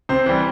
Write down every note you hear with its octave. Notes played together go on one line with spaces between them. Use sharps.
C3 C5
E3 G3